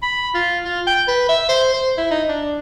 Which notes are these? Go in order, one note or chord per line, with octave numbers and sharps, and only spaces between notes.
B5
F4
F4
G5
B4
E5
C5
C5
E4
D#4
D4